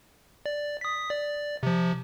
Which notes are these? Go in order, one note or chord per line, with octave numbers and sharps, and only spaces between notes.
D5
D#6 B6
D5
C3 F3